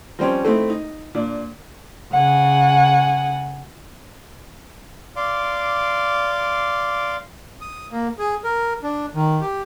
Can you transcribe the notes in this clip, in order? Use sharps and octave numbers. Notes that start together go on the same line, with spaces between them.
F3 G3 C4 C#4
A3 C4 D#4 E4
D#4
A#2 D4
C#3 F#5 G#5
D5 F5 C6 D6
D#6
A#3
G#4
A#4
D4
D#3
G4